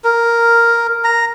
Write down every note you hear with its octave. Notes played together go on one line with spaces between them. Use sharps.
A#4
A#5